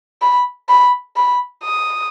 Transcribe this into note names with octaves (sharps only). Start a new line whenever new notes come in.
B5
B5
B5
D#6